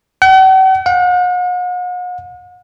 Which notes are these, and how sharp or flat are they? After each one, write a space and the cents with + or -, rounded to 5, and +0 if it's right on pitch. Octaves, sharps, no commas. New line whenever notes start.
F#5 +45
F#5 -45